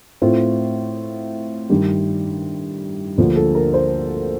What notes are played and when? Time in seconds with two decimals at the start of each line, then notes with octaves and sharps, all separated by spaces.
0.22 A2 A3 C4 F4
1.70 G2 D#3 G3 G4
3.18 D2 D3 F3 A#3
3.36 A4
3.55 A#4
3.74 C5